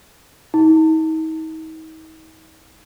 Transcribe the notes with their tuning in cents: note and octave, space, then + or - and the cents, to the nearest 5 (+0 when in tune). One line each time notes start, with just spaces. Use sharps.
D#4 +40